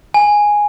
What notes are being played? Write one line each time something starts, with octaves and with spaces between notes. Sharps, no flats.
G#5